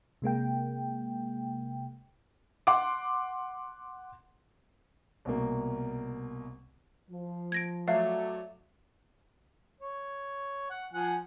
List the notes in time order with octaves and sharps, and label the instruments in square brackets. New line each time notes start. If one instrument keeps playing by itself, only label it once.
[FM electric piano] C3 G#3 A#3 G5
[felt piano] F#5 C6 D6
[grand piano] C2 B2 A#3
[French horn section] F3
[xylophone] G#6 A#6 D7
[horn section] F#3 A3 D5 [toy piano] E5 [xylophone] F5
[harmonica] C#5
F#5
F3 F#5 G#5